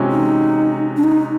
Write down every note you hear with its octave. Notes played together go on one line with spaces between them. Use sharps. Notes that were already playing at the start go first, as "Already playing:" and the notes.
Already playing: C3 E3 G#3 C#4 F#4
D#4
D4
D#4